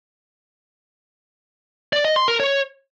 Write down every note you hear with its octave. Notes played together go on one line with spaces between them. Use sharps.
D5
D#5
C6
A#4
C#5